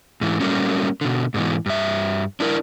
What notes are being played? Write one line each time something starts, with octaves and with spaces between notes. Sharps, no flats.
G#2 E3
F#3 G3 A3 A#3 C#4
B2 D3
G#2 B2 E3
G2 E5
D4 E4 A#4